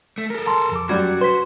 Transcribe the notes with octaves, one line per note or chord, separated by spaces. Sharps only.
A3
A4 A#4
A5 A#5 C6
F2 D6
F#2 G3 F#4 G#6
B4 C6 B6